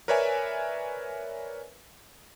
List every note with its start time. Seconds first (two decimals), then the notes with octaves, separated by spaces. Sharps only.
0.08 A#4 B4 C#5 D5 E5 G#5